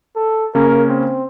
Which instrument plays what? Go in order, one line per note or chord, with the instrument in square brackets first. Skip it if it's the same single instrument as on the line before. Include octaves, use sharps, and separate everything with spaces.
[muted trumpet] A4
[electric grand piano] C#3 A#3 C#4 [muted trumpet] A#4
[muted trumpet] C4